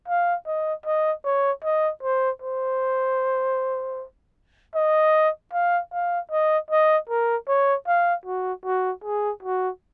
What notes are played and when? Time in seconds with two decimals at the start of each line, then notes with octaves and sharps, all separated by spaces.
0.08 F5
0.47 D#5
0.86 D#5
1.25 C#5
1.64 D#5
2.03 C5
2.42 C5
4.75 D#5
5.53 F5
5.92 F5
6.31 D#5
6.71 D#5
7.09 A#4
7.48 C#5
7.87 F5
8.26 F#4
8.65 F#4
9.04 G#4
9.43 F#4